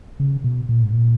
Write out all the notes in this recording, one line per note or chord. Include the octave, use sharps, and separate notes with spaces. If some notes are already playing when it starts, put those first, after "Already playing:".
C#3
B2
A#2
G#2
A#2